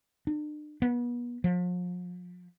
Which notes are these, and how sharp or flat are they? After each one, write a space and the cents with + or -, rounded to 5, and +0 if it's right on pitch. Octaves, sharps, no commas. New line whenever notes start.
D4 +40
B3 -35
F3 +40